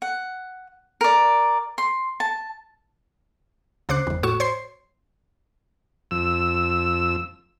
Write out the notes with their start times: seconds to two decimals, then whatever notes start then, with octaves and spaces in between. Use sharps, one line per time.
0.02 F#5
1.01 A#4 D5
1.78 C6
2.20 A5
3.89 D2 C#3 C5 D6 F#6 C7
4.07 G1 E2
4.23 A2 F#4 C#6 E7
4.40 C5 C#5 C6 C7
6.11 F2 E6